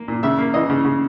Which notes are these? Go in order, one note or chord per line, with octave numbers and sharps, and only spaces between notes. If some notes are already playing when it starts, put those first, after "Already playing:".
Already playing: A#3
A#2
C#3 E5
A#3
E3 D#5
C#3
C#3